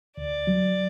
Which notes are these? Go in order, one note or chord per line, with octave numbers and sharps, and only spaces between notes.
D2 D5
F#3